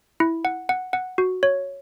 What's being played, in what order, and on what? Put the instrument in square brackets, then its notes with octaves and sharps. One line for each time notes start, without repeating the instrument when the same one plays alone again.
[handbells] E4
F#5
F#5
F#5
F#4
C#5